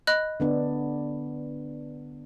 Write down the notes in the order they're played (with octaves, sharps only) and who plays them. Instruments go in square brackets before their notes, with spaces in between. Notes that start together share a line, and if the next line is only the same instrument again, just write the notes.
[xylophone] D#5 B5 F#6
[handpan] D3 B3 D4